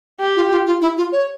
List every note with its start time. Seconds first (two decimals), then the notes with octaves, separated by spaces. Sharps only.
0.20 G4
0.36 F4
0.51 F4
0.66 F4
0.81 E4
0.97 F4
1.12 C#5